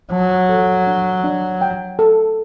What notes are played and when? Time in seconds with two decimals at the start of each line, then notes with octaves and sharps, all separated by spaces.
0.11 F#3 A5
0.49 A4
0.87 D4
1.24 D4
1.61 G5
1.99 A4